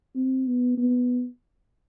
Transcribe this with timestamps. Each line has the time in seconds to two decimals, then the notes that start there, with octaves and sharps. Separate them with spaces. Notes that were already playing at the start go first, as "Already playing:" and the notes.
0.15 C4
0.47 B3
0.78 B3